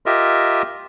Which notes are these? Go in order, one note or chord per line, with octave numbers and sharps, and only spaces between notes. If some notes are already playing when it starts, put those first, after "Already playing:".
F4 G4 A#4 D#5 E5